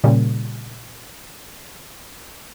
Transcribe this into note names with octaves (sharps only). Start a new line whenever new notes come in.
A#2 C#3 G3